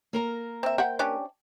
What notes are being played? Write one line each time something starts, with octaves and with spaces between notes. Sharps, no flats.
A#3 A#4 A#5
C4 E5
C5 E5 F#5 G5
C#4 D4 G4